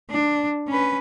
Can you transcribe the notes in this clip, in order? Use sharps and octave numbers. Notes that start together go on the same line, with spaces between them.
D4
C#4 B4